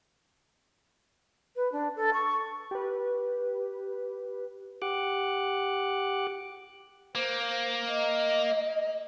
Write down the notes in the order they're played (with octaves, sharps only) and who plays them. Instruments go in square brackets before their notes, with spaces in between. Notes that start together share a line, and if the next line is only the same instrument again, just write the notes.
[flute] B4
D4
A4
C#6
[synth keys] G4 B4
[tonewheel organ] G4 F#5 D6 F#6
[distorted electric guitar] A#3 [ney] C5
[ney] D#5